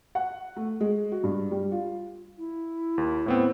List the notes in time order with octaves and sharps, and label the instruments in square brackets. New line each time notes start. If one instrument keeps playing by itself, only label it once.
[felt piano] F#5
A3
G#3
F#4
G2
G3
F4
[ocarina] E4
[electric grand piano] D#2
A2 B3 C4